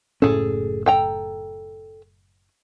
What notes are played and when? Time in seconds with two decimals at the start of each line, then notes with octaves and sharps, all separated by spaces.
0.22 F#1 A2 C#4 G#4 A4
0.86 A4 G5 A#5